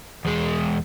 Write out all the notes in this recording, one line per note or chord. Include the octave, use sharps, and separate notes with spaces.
E2 G#3